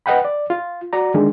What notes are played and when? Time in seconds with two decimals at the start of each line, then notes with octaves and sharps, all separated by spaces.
0.06 B4 D#5 F#5 G5 B5
0.25 D5
0.50 F4
0.93 F#4 D5 A#5
1.14 D3 D#3 G#3 D4